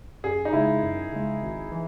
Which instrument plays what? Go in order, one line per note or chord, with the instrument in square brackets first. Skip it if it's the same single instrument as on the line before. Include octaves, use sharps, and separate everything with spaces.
[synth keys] F#2 [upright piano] G#4
[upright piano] D#4
[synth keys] C#3 G#3 [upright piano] E4
[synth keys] F#2
C#3 G#3
G#1
E3